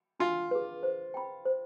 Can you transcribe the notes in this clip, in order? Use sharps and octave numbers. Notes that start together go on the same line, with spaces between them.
D4 F4
G#4 B4
C5
G5 B5
C5